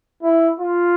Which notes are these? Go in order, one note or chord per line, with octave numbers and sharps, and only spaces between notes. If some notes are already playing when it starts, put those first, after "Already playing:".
E4
F4